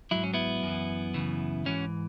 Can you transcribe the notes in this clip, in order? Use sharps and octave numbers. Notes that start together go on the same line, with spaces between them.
G#2 F#3 E4
C#4
B3 E4
F#2 E3
F#2 C#3 E3
G#2 E3 C#4 F#4